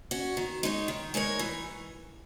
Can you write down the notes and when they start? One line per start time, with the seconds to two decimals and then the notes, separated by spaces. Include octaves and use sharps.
0.11 C#4 F#4
0.37 D#3
0.63 G#3 D#4 A#4 C#5
0.88 D#3
1.14 G#3 D#4 A#4 C#5
1.39 E3